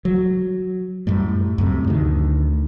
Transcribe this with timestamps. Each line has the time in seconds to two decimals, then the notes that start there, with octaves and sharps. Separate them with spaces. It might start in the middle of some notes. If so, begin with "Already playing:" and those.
0.05 F#3
1.07 F#2 A2 G3
1.58 F#2 A2 C3
1.88 D2 D#3